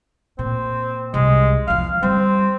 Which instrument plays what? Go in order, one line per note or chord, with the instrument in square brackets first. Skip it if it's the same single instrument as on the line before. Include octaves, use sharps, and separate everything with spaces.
[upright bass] A#2 [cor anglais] C4
[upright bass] C2 [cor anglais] G#3
[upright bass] E2 F3 [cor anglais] F5
[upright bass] G3 [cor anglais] C4